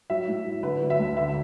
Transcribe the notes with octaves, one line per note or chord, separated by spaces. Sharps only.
F#3 E5
A2
F#3
D3 B4
F#3
E5
D2
D3 E5